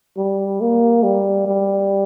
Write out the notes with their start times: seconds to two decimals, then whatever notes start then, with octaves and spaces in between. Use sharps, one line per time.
0.17 G3
0.61 A#3
1.03 G3
1.47 G3